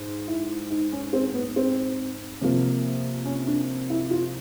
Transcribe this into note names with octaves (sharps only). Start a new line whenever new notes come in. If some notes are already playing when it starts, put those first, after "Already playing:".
Already playing: G#2
E4
D#4
C#4
C4
B3
C4
C3 F3 A#3
C#4
D4
E4
F4